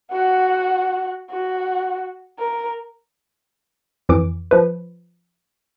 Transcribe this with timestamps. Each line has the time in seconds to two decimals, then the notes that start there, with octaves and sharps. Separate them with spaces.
0.11 F#4 F#5
1.31 F#4
2.39 A#4
4.09 F2 E3 D6
4.51 F3 B4